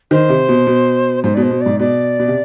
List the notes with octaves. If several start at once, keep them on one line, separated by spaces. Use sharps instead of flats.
D#3 C5
C3
B2
B2
G#2 C5
B2 D5
C5
B2
D5
G#2
B2 D5
B2
C3